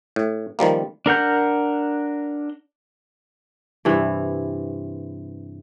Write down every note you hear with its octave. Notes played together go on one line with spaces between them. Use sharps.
A2
D#3 F3 G3 A#3
D4 A#4 F#5 G6
G2 C3 E3